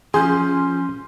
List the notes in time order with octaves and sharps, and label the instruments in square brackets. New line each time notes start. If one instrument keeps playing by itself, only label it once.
[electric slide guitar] F3 [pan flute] C#4 [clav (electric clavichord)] G#4 [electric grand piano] C6 G6